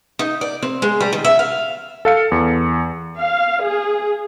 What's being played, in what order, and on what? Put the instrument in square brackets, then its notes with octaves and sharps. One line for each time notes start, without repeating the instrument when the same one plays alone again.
[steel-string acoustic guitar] D#4
D5
C4
G#3
G3
D#3
E5
F5
[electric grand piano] A4 F5 C#7
E2
[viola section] F5
G#4